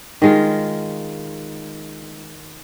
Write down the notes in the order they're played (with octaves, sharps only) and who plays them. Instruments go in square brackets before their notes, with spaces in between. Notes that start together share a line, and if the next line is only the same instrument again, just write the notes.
[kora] D#3 G#3 F4